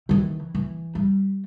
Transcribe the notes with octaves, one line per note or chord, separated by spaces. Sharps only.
D#3 E3
E3
G3